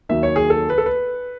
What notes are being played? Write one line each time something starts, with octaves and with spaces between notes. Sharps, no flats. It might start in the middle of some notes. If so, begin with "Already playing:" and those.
D#2 D#3 F#3 E5
C#5
G#4
A4
B4
A4
B4